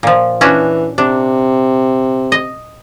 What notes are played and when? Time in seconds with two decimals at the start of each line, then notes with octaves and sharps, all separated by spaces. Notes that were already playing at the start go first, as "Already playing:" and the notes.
0.03 A#2 F3
0.41 E3 C#4 D4 F#4
0.98 C3 D4
2.32 D#5